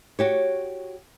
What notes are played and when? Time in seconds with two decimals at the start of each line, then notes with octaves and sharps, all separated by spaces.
0.19 F#4 G4 C#5